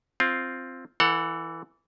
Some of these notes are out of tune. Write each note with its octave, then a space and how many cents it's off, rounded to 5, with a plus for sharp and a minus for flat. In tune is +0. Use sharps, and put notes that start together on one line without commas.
C4 +0 F4 +0
E3 +0 A4 +35 F#5 -10